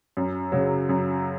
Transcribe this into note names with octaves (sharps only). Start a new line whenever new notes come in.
F#2
C#3 F#3
F#2